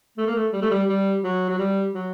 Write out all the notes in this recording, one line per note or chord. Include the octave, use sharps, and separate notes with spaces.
A3
A#3
A3
G3
A3
G3
G3
F#3
F#3
G3
F#3